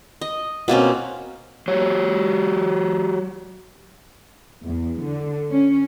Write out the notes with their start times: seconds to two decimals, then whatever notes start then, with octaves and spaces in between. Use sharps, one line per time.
0.21 D#5
0.68 B2 A#3 C4 C#4
1.68 F#3 G4 C#5
4.65 E2
5.02 D3
5.50 C#4